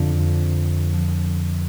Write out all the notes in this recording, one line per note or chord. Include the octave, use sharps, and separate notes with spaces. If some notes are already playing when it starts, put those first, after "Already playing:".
Already playing: F2 D3 F3